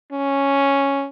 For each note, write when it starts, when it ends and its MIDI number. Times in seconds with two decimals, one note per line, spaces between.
0.12 1.07 61